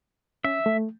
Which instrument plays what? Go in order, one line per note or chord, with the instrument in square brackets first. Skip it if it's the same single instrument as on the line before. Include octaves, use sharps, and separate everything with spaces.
[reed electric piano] C#4 [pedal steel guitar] E5
[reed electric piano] A3